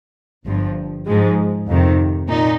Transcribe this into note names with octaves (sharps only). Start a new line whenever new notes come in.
G1 G2 F3
G#2 F3 G#3
F2 C3 D#3
A#2 D#4